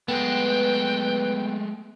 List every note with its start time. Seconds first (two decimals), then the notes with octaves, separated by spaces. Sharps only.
0.08 G#3 A3 B3 B4 G5